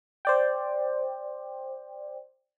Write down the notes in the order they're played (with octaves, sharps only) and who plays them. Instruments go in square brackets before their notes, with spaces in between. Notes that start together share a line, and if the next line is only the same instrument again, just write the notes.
[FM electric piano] C5 D5 G5